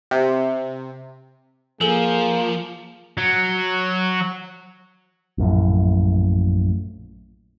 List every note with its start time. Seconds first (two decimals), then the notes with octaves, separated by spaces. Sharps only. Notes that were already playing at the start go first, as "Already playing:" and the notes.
0.11 C3
1.81 F3 A#3 G#4 A4 G7
3.17 F#3
5.38 A#1 F#2 A2